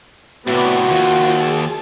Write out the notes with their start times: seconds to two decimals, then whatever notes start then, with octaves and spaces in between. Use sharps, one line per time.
0.47 A2 C3 B3 F#4 D5
0.90 D#2 F3 F4
1.41 G#4 A5